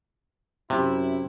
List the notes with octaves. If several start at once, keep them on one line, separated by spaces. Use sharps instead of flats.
F#2 C3 E4